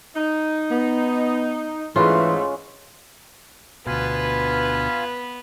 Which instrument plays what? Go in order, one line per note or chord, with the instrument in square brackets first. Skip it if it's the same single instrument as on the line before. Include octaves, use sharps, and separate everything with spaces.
[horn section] D#4
[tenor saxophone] B3
[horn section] G#2 A3 [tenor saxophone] E3 [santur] G#3 C#4 [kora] F4 B4
[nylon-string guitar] D2 B2 [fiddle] B3 [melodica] F4 F5 G#5 [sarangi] B4